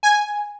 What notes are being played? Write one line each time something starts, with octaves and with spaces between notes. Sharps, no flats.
G#5